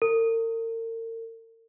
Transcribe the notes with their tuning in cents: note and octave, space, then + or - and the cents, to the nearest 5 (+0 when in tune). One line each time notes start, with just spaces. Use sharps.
A#4 -40